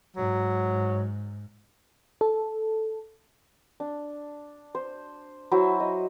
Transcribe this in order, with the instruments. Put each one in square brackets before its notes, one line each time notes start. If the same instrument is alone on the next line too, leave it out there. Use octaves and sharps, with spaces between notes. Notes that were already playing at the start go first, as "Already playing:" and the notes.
[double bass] G#2 [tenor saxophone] F#3
[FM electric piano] A4
[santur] D4
C5
F#3 E4 C5 E5
D#5